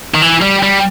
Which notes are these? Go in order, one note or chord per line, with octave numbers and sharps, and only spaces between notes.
D#3
E3
G3
G3